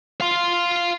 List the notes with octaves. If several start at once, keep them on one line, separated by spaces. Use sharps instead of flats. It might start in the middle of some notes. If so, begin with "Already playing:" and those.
F5 C6